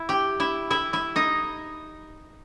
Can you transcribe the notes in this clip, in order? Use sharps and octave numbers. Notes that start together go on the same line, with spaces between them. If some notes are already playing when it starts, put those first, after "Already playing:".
Already playing: E4 E5
G4 G5
E4 E5
E4 E5
E4 E5
D#4 D#5